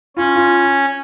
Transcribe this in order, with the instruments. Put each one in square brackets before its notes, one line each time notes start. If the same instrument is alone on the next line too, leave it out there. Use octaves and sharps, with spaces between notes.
[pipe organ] C#4 [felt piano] F4
[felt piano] F4